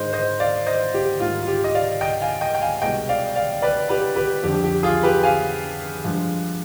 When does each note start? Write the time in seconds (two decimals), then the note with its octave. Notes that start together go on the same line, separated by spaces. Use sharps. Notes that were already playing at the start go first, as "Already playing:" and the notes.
Already playing: G#2 D#3 G#3 C5 D#5
0.13 C5 D#5
0.40 D5 F5
0.66 C5 D#5
0.94 G4
1.20 G#2 D#3 G3 F4
1.43 F4
1.47 G4
1.64 D#5
1.75 D5 F5
2.01 D#5 G5
2.21 F5 G#5
2.41 D#5 G5
2.55 G5
2.61 F5 G#5
2.82 C2 B2 G#3 D#5 G5
3.09 D5 F5
3.36 D5 F5
3.62 B4 D5
3.89 G4 B4
4.16 G4 B4
4.43 F2 D3 G3 G4
4.64 G4
4.83 F4 G#4
5.03 G4 B4
5.23 F5 G#5
6.04 G2 F3 G#3